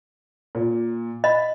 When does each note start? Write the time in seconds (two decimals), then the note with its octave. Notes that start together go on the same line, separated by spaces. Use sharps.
0.55 A#2
1.24 D#5 B5